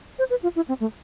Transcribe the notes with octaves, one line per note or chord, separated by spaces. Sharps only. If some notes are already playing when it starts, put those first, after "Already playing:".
C5
B4
F4
E4
C4
A3